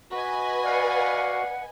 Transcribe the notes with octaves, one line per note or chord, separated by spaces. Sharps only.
F#4 B4 D#5 G#5
D5 F5 F#5